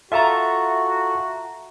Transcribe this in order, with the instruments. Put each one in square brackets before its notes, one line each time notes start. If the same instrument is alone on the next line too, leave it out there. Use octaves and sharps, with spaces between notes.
[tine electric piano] F4 A4 A5 [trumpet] F#4 [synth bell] E5 A#5